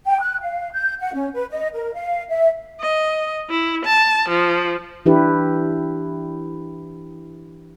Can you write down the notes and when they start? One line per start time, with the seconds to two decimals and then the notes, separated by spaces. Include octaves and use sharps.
0.06 G5
0.20 F#6
0.41 F5
0.73 G6
1.01 F#5
1.14 C#4
1.34 B4
1.50 D#5
1.73 A#4
1.93 F5
2.29 E5
2.81 D#5
3.50 E4
3.85 A5
4.29 F3
5.06 E3 D4 E4 G4 B4